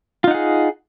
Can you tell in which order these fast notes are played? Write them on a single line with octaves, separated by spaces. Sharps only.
F4 D#4 F#5 G#4